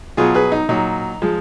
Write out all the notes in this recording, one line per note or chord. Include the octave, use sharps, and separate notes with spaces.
B2 F#3 F4 G#4
G#4 B4
D#4
A#2 F#3 D#4
F3 G#3